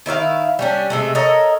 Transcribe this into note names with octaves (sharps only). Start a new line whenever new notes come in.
D#3 E4 C#5 F5
G3 C#4 D4
C3 G#3 A3
A4 A#4 C#5 D#5